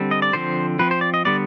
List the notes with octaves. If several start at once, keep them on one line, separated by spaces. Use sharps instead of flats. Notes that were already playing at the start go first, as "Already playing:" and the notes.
Already playing: D3 G3 C4
D#5
D5
D3 F3 C4 C5
F3 C4 B4
C5
D5
D#5
D3 G3 B3 D5